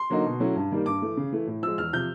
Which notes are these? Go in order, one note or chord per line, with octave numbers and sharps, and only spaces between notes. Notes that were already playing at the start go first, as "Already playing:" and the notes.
Already playing: C6
D3 F#3 A#3 D#4
B2
F#3 A3 C#4 E4
G2
D#3 G3 A#3
G2 D6
E3 A3
C#3
E3 A3
A2
F3 G#3 E6
E2 F6
C3 F3 G6